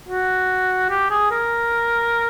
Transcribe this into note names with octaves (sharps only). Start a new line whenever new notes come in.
F#4
G4
G#4
A#4